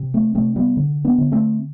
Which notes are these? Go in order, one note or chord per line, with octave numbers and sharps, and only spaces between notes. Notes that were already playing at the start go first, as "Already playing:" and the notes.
Already playing: C3
A3 C4
C3 A3 C4
G3 B3
D3
B3 D4
D3
A3 C4